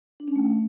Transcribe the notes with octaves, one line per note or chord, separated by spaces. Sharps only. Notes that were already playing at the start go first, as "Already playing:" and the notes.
D4
C#4
A3